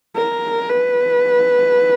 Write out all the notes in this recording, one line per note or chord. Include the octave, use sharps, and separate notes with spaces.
A#4
B4